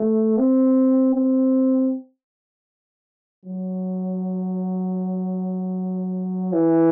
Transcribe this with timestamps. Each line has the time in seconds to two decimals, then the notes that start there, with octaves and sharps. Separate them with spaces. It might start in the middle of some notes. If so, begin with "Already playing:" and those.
Already playing: A3
0.38 C4
1.15 C4
3.45 F#3
6.53 E3